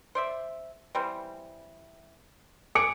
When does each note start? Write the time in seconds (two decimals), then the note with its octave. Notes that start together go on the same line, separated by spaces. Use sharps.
0.15 C5 D5 E5
0.95 E3 G3 C4
2.75 G#4 D6 C#7 D7